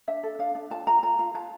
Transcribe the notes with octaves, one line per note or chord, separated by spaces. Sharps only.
D4 E5
A4
D4 F5
D4
F4 A5
F4 A#5
F4 A#5
F4
F4 A5